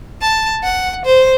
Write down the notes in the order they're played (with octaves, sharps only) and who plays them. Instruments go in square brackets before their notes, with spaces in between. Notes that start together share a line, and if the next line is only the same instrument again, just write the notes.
[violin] A5
F#5
C5